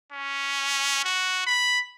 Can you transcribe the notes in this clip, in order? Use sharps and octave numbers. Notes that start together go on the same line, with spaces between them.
C#4
F#4
B5